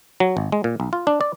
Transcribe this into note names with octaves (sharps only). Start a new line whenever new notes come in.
F#3
G#1
G#3
A#2
B1
F4
D4
D5